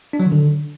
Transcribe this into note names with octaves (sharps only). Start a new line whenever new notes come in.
D4
F#3
D#3
D3